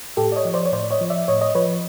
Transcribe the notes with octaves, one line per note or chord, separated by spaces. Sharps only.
A2 G4 A4
D5
C#5 D#5
F3
C5 D5
C#5
A2 C5 D5
C#5 D#5
F3
D5 E5
A2 C#5 D#5
C#5 D#5
F3 B4 C#5